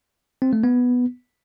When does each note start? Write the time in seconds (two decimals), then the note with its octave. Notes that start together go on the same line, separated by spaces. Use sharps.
0.42 C4
0.53 A3
0.64 B3